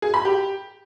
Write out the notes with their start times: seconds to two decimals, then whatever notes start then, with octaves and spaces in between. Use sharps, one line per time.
0.02 G#4
0.14 B5
0.25 G4